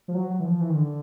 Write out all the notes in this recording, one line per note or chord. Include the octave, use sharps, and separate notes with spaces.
F3
F#3
F#3
E3
F3
E3
D#3
D3